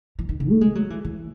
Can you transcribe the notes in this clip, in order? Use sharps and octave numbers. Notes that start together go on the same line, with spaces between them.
E3
D#3
C#3
A3
G#3
F#3
E3
E3